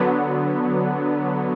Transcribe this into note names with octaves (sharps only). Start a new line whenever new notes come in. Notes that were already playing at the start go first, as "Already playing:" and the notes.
Already playing: D3 F#3 B3